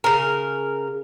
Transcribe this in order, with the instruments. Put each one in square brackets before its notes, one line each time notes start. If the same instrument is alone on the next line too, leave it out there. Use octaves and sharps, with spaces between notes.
[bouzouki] C#3 A#4